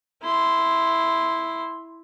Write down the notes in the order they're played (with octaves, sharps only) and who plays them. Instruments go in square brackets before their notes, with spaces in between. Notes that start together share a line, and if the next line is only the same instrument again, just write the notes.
[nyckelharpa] E4 C6